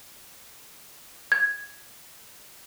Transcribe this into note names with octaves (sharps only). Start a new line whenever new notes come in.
G#6